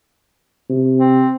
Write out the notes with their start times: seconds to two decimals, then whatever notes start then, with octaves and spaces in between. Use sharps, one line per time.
0.69 C3
0.99 C4